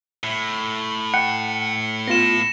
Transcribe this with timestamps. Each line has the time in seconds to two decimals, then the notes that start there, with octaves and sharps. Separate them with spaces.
0.23 A2
1.14 F#5 G5 C#7
2.08 B3 F4 A#6 E7